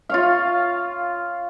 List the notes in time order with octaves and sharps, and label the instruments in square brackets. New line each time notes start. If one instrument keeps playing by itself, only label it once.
[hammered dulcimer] F4 C#5 F5